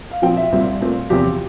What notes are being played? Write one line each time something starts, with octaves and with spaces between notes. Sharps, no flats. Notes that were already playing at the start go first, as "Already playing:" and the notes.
F5
A#2 F3 C4 G5
E5
C2 A#2 G3 C4
A#2 A3 C4
E2 C3 F3 C4 G4